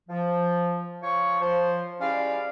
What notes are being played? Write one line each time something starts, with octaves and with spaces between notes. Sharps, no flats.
F3
F3 C#5 C#6
F3 C5
G3 G#3 C#4 E4 D5 F5